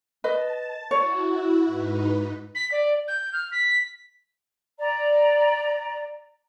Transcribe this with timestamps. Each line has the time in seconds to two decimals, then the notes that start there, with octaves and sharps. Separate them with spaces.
0.24 B4 D#5 A5
0.91 E4 F#4 C#5
1.65 G#2 D#4 B4
2.55 B6
2.72 D5
3.08 G6
3.33 F6
3.52 B6
4.79 D5 A#5